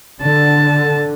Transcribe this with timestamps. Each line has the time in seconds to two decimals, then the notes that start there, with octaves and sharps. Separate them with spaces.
0.22 D3 A5